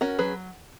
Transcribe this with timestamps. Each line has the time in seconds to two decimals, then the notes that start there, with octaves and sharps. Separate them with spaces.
0.01 C#4 F#4 A#4
0.19 F#3 G#4 B4